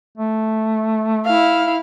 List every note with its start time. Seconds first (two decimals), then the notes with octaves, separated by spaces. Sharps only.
0.17 A3
1.25 E4 F5